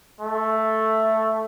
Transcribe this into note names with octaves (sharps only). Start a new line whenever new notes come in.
A3